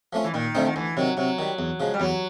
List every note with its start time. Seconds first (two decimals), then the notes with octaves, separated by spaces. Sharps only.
0.13 F3 A3 C#4 F4
0.24 E3
0.34 A#2 D#3
0.55 D3 F3 A3 C4 D#4
0.65 D#3
0.76 D2 E3
0.97 C3 D#3 F#3
1.17 C3 F#3
1.39 D#3 G3
1.59 E2
1.80 C#3 F3 G#3
1.94 G3
2.00 E2 F#3